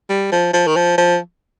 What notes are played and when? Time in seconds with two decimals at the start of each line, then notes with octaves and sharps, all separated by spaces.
0.09 G3
0.32 F3
0.53 F3
0.67 D#3
0.76 F3
0.98 F3